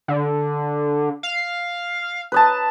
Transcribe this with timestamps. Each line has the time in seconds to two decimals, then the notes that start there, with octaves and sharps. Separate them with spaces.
0.08 D3
1.23 F5
2.32 B4 D#5 A5